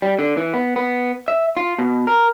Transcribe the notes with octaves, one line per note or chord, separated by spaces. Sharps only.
G3
D3
E3
B3
B3
E5
F4
B2
A#4